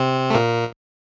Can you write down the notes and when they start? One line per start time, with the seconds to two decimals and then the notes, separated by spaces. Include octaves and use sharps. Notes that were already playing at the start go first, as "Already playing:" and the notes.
Already playing: C3 C4
0.30 A3
0.34 A#2 A#3